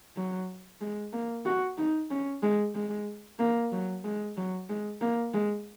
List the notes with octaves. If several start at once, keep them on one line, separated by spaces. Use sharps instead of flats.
F#3
G#3
A#3
F#4
D#4
C#4
G#3
G#3
A#3
F#3
G#3
F#3
G#3
A#3
G#3